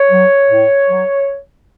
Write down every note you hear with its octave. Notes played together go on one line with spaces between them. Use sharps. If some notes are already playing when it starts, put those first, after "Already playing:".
Already playing: C#5
F#3
A2
F#3